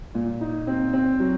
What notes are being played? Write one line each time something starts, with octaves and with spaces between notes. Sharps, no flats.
A#2
D#4
C4
C4
F#3